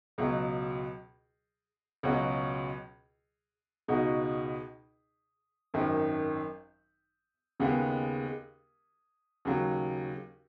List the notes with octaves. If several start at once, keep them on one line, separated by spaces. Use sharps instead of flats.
C#2 B2 F#3
C#2 B2 F#3 C#4 F#4
C#2 B2 G#3 D#4 F#4
G#1 F#2 D#3
D#2 C#3 G#3 B3 G#4
D#2 C#3 F#3